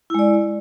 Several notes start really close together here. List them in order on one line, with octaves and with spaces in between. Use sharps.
E4 G#3 D5